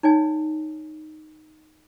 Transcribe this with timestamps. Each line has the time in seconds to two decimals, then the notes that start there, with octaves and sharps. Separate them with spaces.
0.03 D#4 C#5 D5 G#5